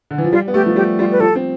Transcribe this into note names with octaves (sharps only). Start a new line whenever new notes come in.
D3
E3
F3
G3 F4
B3
A3 G4
F3
G3 G4
G3 F4
B4
F3 A4
C4